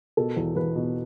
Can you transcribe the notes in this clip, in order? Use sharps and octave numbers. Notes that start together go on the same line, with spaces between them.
B2 A4
E2
E2 B4
B2